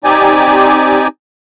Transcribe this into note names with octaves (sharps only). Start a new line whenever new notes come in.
C4 D#4 G4 D5 G#5